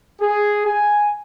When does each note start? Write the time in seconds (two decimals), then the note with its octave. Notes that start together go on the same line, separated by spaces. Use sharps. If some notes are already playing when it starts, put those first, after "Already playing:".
0.21 G#4
0.65 G#5